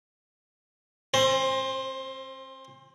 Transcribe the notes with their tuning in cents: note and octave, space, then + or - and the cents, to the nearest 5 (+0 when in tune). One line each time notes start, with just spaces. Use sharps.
C4 +45 C5 +15